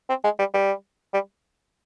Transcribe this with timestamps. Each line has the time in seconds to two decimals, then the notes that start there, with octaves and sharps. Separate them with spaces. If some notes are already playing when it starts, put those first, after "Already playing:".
0.09 C4
0.24 G#3
0.39 G3
0.54 G3
1.14 G3